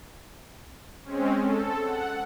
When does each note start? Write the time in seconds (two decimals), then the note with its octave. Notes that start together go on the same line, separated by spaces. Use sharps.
1.04 G#3 C4 C#4
1.40 A4
1.84 F#5